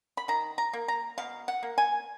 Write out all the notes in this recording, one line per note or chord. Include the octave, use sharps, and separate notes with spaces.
B5
D#3 A#5
A#5
A#3
A#5
B2 F5
F#5
A#3
G#5